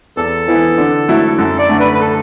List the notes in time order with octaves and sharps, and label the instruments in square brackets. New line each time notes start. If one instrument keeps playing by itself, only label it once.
[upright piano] E2 [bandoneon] A4
[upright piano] E3 B3 E4
D3
F#3 A3 E4
[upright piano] F#2 [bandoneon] A4
[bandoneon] D5
[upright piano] D3 A3
[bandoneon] B4
B4
A4